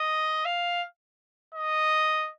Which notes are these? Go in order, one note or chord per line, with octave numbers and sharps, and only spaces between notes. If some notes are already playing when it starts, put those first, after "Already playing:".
Already playing: D#5
F5
D#5